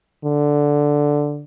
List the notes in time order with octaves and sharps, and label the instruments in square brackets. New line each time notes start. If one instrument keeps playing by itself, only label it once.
[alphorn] D3